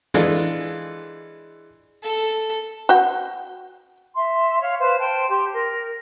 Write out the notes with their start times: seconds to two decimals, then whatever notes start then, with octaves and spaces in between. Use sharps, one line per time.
0.14 E3 G#3 D4 F4 A4
2.04 A4
2.89 F#4 G5
4.16 E5 C6
4.61 C#5 F5
4.80 B4 C5 F5
4.99 C5 G5 A5
5.29 G4 C6
5.52 A#4